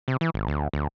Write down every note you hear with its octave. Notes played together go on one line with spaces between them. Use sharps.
C3
E3
G#1
D2
D2